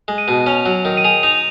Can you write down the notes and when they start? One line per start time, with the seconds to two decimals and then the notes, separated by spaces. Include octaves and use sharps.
0.08 G#3
0.18 D#7
0.28 B2
0.46 C#4 F7
0.66 F#3
0.85 D#3
0.97 D#7
1.04 G#4 F7
1.23 D#4 F7